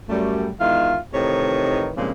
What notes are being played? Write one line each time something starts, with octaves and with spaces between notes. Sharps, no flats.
F#2 G3 A3
E2 D#3 G#3 F4 E5 F5
A2 C3 D#3 E3 D#4 C#5
G2 A#2 C#3 F3 G#3 C4